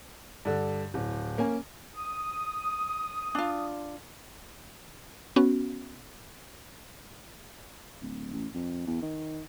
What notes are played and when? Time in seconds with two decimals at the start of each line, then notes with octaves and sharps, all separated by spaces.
0.45 G2 D3
0.94 D1
1.38 A#3 C#4 G#5
1.96 D#6
3.35 D4 F4
5.36 B3 C#4 F#4
8.02 D1
8.33 A1
8.54 F2
8.87 E2
9.02 D#3